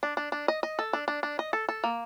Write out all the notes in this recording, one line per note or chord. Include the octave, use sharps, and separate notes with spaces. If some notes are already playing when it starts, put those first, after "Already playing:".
D4
D4
D4
D#5
D#5
A4
D4
D4
D4
D#5
A4
A4
A#3